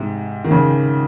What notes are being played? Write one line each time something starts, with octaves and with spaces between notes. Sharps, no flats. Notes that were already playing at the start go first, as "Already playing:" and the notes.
Already playing: G#2 C3
D#3
C#3